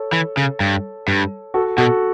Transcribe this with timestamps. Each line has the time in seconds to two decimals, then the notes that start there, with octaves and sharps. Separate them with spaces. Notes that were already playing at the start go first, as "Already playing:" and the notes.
Already playing: A4 C#5
0.13 E3
0.37 C#3
0.60 G2
1.08 G2
1.54 F#4 A4
1.78 B2 F#4 A4